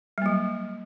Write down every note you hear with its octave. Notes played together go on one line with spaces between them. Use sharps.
F#3 G3 A#3